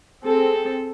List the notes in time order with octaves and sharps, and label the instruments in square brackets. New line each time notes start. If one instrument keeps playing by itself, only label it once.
[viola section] C4 G#4 A4